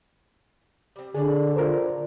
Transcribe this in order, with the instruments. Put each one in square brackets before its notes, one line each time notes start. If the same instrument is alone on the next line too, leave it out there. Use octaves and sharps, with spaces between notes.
[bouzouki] G3 C4
[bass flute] D3 [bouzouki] D4 C#5 D5 [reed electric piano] G#4
[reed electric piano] F4 A#4 C5